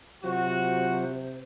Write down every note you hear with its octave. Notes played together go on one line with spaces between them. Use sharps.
C3 F#3 F4 F#4 C5